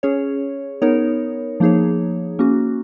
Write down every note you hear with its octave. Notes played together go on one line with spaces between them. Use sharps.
C#4 G#4 C#5
B3 D#4 A#4 C#5
F3 A#3 D#4 G#4 C#5
A#3 C#4 F#4